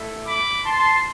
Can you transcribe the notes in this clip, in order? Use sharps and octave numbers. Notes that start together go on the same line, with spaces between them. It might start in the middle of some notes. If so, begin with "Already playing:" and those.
Already playing: A3 E4
B5 D6
A5 C6